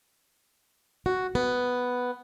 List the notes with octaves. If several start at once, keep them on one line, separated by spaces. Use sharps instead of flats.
F#4
B3